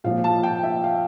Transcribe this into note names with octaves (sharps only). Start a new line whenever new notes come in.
A#2 F3 F5
A5
G5
E5
F5